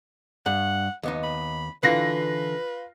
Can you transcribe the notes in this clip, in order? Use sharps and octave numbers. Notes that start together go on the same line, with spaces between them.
G2 F#5
D#2 B3 D#4
B5
D3 E3 F4 B4 A#6 C7